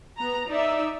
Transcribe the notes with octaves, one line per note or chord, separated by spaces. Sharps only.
B3 A#5
D#4 D5 E5